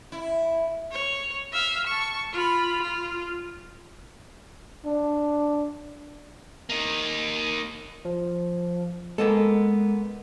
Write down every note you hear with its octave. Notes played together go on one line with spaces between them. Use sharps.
E4
C#5
E5 F5
A5 C#6
F4 B5
F4
D4
A#3 D#4
F3
G#3 A#3 B3 A4